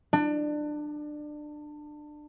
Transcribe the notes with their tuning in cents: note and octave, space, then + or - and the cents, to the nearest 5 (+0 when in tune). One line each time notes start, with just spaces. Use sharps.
D4 +25